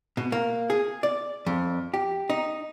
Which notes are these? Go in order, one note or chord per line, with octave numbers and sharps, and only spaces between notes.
B2
A#3
G#4
D5
F2
G4
D#4